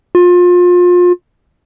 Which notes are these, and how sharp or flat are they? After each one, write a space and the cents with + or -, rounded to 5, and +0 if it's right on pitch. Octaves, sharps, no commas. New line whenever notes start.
F4 +30